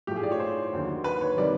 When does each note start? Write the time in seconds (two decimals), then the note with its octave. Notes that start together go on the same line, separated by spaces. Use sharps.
0.07 A2 F3 A3 G4
0.16 G#4
0.23 D5
0.32 C#5
0.40 C5
0.73 D#2 D3 F#3
1.04 B4
1.21 C#5
1.37 C3 D#3 G3 D5